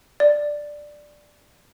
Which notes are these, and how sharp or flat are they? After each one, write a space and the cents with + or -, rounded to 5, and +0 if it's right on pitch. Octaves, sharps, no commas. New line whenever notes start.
D5 +5